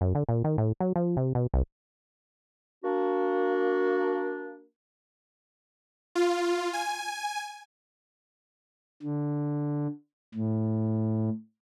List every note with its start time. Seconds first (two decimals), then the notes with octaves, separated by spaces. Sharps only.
0.01 F#2
0.15 D3
0.29 A#2
0.44 D#3
0.58 A2
0.80 F#3
0.96 F3
1.17 C3
1.35 B2
1.54 C2
2.84 A#3 D4 F#4
6.15 F4
6.73 G#5
9.03 D3
10.35 A2